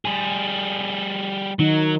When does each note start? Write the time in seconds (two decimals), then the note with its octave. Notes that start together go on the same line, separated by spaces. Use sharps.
0.05 G3 G#4
1.59 D#3 F#3 D#4